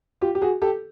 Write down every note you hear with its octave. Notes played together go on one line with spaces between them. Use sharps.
F4 G4
G4
F#4 G#4
G4 A4